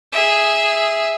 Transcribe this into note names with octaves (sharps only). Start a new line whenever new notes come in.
G#4 E5